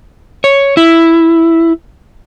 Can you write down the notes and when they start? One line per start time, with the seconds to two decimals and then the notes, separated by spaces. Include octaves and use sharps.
0.44 C#5
0.77 E4